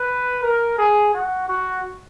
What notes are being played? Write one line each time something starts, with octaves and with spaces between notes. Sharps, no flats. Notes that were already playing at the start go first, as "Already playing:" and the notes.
Already playing: B4
A#4
G#4
F#4
F#4